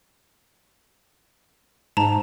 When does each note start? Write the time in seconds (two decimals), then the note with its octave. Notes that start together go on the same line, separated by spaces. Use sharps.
1.97 G#2 A5 A#5